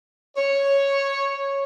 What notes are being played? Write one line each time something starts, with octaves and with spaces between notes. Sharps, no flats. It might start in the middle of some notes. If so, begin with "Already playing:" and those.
C#5